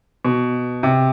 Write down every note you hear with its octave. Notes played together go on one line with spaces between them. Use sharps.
B2
C3